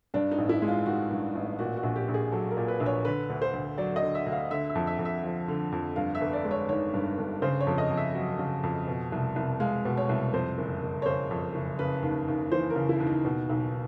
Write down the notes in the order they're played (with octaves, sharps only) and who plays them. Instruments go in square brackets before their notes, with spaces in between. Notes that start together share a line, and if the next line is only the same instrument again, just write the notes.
[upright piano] G2 D4
D#4
A1
E4
G#3
F4
D#3 F#4
G2
A1
A#2 F#4
F#4
A#1
G4
A#1
G#4
F#3 A4
A#4
A#2
B4
A#1
C#5
D3 B4
D2
C5
D2
F#3 D5
D#5
D3
E5
D2
F5
D3 E5
E5
F2
E5
F2
E5
F3
D3
F2
G2 F5
E5
G1
D5
G#3
C#5
D#3 C#5
G2
G1
C#3 C5
C#5
F2
D#5
F2
E5
F#3
C#3
F2
B2
C2
C2
G#3 F5
B2
C#5
C2
F2 C5
F#1
F#1
C#5
C#3 C5
F2
F#1
C#3 B4
D#2
D#2
E3 C5
A#4
C#3
E4
D#2
D#4
B2
B1